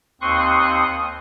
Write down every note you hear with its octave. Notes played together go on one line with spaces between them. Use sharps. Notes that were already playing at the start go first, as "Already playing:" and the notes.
D#2 C4 C6 C#6 D#6 F#6